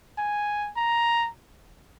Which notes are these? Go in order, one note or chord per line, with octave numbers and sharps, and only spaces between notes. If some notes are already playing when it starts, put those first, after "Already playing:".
G#5
A#5